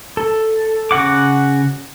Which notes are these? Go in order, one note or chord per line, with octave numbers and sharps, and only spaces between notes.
A4
C#3 F#4 F#5 D6